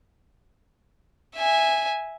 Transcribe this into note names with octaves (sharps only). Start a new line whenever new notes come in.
E5 G#5